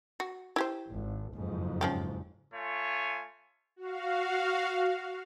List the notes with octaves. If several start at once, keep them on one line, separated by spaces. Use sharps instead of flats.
F#4
E4 G4 C5
G#1
F#1 F2 G#2
F3 C#4 G4
A3 F4 C#5 G#5
F#4 F5